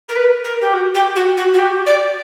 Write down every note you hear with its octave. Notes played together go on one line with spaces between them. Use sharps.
A#4
B4
A#4
G4
F#4
G4
F#4
F#4
F#4
G4
D5